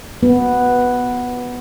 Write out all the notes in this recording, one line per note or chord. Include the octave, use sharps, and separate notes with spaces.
B3